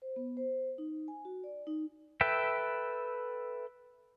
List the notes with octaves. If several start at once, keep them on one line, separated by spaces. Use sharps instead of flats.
C5
B3
C5
D#4
G#5
F#4
D5
D#4
A4 B4 E5 G5